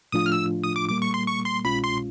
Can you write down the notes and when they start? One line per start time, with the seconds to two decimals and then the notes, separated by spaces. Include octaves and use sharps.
0.12 A2 F3 A3 D4 F4 D#6
0.26 F6
0.32 E6
0.64 D#6
0.76 D6
0.88 A#2 G3 A#3 D6
1.02 C#6
1.14 C6
1.27 C#6
1.45 C6
1.64 C2 B2 G#3 C#4 F4 B5
1.84 C6